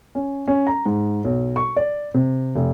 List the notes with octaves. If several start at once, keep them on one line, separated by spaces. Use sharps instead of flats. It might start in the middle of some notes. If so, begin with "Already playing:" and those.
C#4
C#4
A#5
G#2
B1
C#6
D5
C3
F1